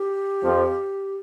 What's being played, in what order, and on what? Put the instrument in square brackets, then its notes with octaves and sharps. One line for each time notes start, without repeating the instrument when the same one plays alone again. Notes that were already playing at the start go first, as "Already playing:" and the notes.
Already playing: [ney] G4
[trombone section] F2 F3